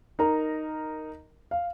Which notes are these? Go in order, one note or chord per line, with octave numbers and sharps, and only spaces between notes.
D#4 A#4 A#5
F5